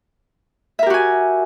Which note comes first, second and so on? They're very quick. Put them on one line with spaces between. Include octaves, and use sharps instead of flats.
E5 A#4 G4 F#4 G#5